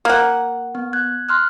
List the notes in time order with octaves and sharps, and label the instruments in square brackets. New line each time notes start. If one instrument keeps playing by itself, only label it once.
[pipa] A#3 F#5
[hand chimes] B3
F#6 G#6
C6 F6 F#6